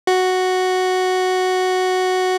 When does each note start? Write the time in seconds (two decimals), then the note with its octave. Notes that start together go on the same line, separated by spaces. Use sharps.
0.07 F#4